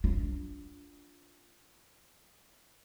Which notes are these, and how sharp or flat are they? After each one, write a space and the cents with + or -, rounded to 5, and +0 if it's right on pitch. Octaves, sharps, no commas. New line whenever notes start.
D4 -25 F4 +0